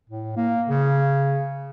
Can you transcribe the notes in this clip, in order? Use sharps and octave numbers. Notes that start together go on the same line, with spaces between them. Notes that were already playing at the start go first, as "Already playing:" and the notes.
A2
A#3
C#3